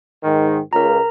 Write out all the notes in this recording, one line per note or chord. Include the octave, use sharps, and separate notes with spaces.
G#2 D#3
C#2 A#4 A#5